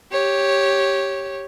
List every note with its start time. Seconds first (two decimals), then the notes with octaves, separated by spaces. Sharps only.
0.12 G4 C#5